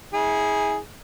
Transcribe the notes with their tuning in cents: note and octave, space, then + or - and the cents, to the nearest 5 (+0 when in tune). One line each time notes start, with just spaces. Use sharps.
E4 -40 G#4 +0